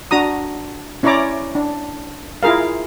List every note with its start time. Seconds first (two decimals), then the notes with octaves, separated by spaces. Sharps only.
0.11 D4 F#4 A#5 D#6
1.03 C#4 E4 C#5 D5 A#5 D6
1.55 D4
2.43 E4 F4 G#4 A#4 F5